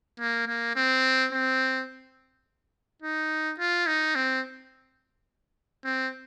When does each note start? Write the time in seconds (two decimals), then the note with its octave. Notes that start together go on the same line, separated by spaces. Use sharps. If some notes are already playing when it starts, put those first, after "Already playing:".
0.20 A#3
0.48 A#3
0.76 C4
1.32 C4
3.02 D#4
3.60 F4
3.87 D#4
4.15 C4
5.85 C4